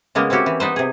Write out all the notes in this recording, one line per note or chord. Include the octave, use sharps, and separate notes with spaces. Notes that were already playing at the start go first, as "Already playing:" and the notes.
C#3 G#3 A#3 B3
C4 C#4 E4 F#4 G4
E3
B3 D#4 B4 C5
C3 G#4